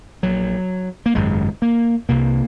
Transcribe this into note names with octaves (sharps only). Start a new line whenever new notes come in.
A#1 A#2 F#3
A#3
G#1 F#2 C#3 G#3
A#3
C2 C3 A#3